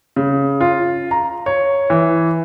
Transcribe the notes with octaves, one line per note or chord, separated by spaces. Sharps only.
C#3
F4
A#5
C#5
E3